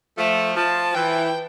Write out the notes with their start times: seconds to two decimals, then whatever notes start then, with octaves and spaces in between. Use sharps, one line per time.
0.18 F3 A3
0.56 F3 A5
0.95 E3 G5